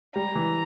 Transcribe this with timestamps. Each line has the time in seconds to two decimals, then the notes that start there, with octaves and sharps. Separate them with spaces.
0.15 G3 A#5
0.35 E3